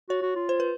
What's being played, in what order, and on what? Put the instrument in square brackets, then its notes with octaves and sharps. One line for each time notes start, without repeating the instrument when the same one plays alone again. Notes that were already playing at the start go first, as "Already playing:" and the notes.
[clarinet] F#4 [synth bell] C#5
[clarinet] F#4
F4
[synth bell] C5
B4